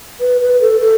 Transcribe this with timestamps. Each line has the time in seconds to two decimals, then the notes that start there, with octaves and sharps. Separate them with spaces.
0.20 B4
0.41 B4
0.61 A4
0.81 A4